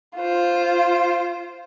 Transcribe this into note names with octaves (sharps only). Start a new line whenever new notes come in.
F4 C5